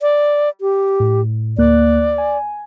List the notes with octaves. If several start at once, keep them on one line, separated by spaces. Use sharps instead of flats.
D5
G4
A2
D2 A#3 D5 F#6
G#5